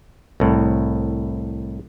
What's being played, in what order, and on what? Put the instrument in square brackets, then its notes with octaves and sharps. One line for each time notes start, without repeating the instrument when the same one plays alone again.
[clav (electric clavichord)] C2 A2